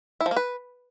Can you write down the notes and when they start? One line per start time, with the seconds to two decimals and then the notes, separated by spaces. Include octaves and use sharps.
0.21 E4
0.26 F3
0.31 A#3
0.36 B4